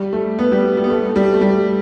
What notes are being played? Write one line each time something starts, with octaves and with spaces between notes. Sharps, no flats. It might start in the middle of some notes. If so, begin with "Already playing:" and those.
Already playing: G3
A3
B3
G3
G3
B3
A3
A3
G3
A3
G3